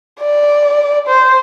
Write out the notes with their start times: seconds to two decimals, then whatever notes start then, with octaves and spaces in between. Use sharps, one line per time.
0.20 D5
1.08 C5